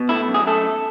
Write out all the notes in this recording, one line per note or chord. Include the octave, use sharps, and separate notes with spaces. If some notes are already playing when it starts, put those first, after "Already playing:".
Already playing: B2
A3 E4
F#2
G#4
A3 A4